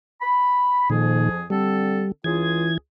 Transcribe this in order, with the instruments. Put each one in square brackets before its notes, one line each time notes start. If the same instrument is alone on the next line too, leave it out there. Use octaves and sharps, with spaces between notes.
[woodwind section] B5
[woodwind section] F2 F3 G#4 [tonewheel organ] A#2 D#3
[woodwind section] D3 C4 A4 [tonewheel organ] G3
[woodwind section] C#2 F4 G#4 [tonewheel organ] E3 G#6